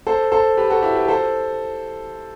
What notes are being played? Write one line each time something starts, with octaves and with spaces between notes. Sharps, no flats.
A4 C5
A4 C5
G4 B4
F#4 A4
E4 G4
G4 B4
A4 C5